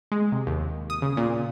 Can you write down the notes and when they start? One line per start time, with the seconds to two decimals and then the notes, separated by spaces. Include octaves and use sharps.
0.12 G#3
0.32 C3
0.47 D#2
0.90 D#6
1.02 C#3
1.17 A#2